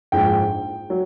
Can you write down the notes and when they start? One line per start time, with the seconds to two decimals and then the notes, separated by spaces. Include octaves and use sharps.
0.12 A#1 G#2 F3 G5
0.90 F#3